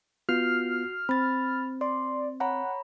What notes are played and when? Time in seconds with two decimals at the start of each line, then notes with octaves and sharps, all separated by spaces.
0.29 B3 F4 F#4 F6 C7
1.09 C4 B5 A6
1.81 D5 C6
2.40 C#5 F#5 A#5 B5